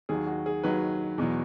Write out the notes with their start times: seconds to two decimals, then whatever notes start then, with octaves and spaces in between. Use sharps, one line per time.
0.09 D#2 D#3 F#3 G#4
0.27 F#4
0.46 G#4
0.63 D#2 D#3 F#3 B4
1.18 E2 B2 F#3